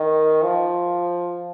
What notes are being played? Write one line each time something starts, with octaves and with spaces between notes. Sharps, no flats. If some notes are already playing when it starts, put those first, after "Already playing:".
Already playing: D#3
F3